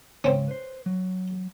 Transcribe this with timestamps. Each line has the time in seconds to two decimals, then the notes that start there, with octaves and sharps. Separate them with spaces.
0.24 G#2 C#3 C4 C#4
0.48 B4 C5
0.86 F#3